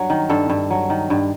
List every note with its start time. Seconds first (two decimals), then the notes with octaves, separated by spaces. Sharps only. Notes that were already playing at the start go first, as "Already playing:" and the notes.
Already playing: G2 F#3
0.10 D#3
0.29 G2 A4
0.50 G2
0.70 F#3
0.90 D#3
1.10 G2